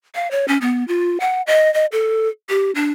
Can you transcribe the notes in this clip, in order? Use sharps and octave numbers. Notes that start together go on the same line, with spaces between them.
F5
C#5
C#4
B3
F4
F#5
D#5
D#5
A4
G4
D4